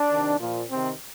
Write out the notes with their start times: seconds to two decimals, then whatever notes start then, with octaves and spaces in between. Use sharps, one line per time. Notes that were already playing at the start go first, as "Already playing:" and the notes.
Already playing: D4
0.09 C3 D#3
0.38 A#2 F3
0.68 C3 D#3 C4